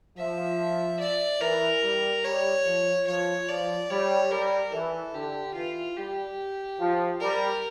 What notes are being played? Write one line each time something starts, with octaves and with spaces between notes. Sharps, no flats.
F3 E5
D5
E3 A#4
G3
G3 C#5
F3
F3 C#5
F3 D5
G3 C#5
G3 A#4
E3 A4
D3 G4
E3 F4
G3 G4
F3
G3 A#4